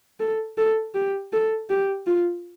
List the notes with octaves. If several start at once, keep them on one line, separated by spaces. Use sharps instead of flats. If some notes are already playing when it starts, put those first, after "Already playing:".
A4
A4
G4
A4
G4
F4